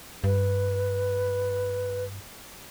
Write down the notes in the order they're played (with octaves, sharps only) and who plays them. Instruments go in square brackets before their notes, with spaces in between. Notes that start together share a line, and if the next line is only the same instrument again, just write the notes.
[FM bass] G2 [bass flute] B4